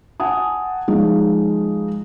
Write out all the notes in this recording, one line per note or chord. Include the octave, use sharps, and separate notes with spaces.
F#5 G#5 A5 D#6
F3 G#3 D#4 F4